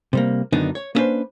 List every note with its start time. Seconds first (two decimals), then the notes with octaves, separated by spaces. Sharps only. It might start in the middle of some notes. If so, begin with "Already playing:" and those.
0.13 C3 G3 A#3
0.52 F#2 D3 D#3 B3 D4 D#4
0.75 C#5
0.95 A#3 B3 C#4 D4 B4 C5